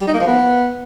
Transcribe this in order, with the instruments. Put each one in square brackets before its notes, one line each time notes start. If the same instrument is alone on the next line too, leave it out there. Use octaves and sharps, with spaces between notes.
[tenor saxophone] G3
D#4
A#3
F3
B3